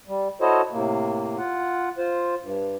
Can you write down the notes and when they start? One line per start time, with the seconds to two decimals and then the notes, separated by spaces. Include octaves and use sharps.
0.08 G3
0.41 E4 F#4 A4 C5 C#5 D#5
0.72 A2 C3 A#3
1.38 F4 F#5
1.98 F4 C5
2.42 G2